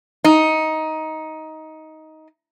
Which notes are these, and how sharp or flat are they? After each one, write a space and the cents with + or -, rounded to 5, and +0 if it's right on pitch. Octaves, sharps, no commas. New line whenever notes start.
D#4 +15